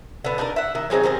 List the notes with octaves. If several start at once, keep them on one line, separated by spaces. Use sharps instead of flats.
D3 B3
D4 D#4 G#4 A#4
E5 F#5
D#3 E5
F#3 G#3 C4 D#4
D#3 G3 C4 G#4